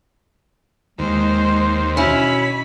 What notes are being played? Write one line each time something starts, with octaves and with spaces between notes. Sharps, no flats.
D#2 G#3 C5
B2 C#4 E4 B5